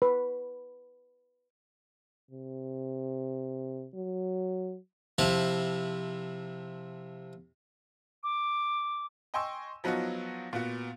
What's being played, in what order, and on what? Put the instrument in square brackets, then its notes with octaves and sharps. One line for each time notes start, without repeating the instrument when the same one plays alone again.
[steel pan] B4
[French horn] C3
F#3
[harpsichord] C3 F3 E4 A5 B5
[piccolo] D6
[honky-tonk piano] D#5 G5 G#5 C6 C#6 E6
F3 F#3 B3 D#4 F4 F#4
A#2 B3 F#4